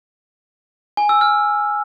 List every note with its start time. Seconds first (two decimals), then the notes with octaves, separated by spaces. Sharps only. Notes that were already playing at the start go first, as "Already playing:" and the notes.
0.97 G#5
1.09 E6
1.21 F6